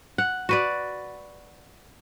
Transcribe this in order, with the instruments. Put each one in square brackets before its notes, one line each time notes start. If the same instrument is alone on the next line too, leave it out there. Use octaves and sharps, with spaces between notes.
[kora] F#5
F#4 B4 D5